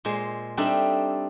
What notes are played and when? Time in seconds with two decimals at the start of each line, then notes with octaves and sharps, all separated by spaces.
0.05 A#2 G#3 C5
0.57 G3 C4 D4 D#4 A4 E5